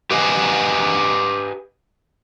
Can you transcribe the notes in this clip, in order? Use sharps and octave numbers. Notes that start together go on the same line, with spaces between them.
G4 B4 D#5 F5 G5 G#5